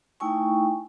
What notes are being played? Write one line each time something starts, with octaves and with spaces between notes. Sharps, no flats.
A3 D#4 E4 G5 G#5 C#6